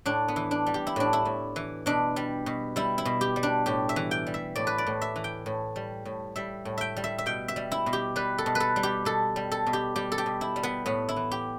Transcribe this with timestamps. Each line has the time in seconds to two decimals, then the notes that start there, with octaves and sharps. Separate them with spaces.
0.05 A2 D4
0.28 B3
0.36 E3
0.51 D4
0.66 G3
0.74 G4
0.87 E4
0.96 A2 D4
1.13 E4
1.25 A2
1.56 E3
1.86 B2 D4
2.16 G3
2.46 B2
2.76 G3 E4
2.98 E4
3.05 B2
3.21 G4
3.36 G3
3.43 D4
3.66 A2 G4
3.89 E5
3.96 E3
4.11 G5
4.27 G3
4.34 E5
4.56 A2 D5
4.67 B4
4.78 D5
4.87 A2
5.02 E5
5.16 E3
5.24 G5
5.46 A2
5.76 G3
6.05 A2
6.36 G3 E5
6.65 A2
6.78 E5 G5
6.97 G3
7.04 E5
7.18 E5
7.26 B2 G5
7.48 E5
7.56 G3
7.72 E4
7.86 B2
7.93 G4
8.16 G3 B4
8.38 A4
8.46 B2
8.55 B4
8.60 A4
8.76 G3
8.83 G4
9.05 B2 A4
9.36 G3
9.52 A4
9.67 B2
9.73 G4
9.96 G3 G4
10.12 A4
10.18 G4
10.26 B2
10.41 E4
10.56 G3
10.63 B3
10.86 A2 B3
11.09 E4
11.16 E3
11.31 G4